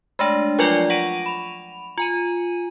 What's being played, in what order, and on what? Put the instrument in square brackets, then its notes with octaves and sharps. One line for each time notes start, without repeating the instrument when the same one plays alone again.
[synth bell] G#3 A3 D4
F3 F#3 F4 D5 G5 D6
F#5 C#6 A#6 D7 D#7
B5 F7
F4 G#5 D#7